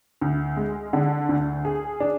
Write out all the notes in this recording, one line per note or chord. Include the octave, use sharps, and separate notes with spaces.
D2
G#3
D3
D2
G#4
D4